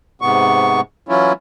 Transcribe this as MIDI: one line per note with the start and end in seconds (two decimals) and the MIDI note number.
0.21 0.81 44
0.21 0.81 48
0.21 0.81 59
0.21 0.81 85
1.09 1.33 52
1.09 1.33 54
1.09 1.33 61
1.09 1.33 64
1.09 1.33 65